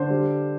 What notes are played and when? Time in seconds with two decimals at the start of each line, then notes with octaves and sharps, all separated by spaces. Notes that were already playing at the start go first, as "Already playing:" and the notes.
Already playing: D3 C5
0.10 G3